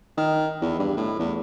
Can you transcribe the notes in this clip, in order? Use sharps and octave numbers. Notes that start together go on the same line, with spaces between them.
D#3
E2
G2
A2
E2